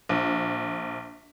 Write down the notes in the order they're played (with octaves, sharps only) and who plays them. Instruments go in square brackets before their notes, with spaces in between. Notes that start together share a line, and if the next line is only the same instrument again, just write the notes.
[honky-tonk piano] A#1